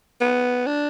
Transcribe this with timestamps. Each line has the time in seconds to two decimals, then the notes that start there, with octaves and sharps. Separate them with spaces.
0.21 B3
0.67 D4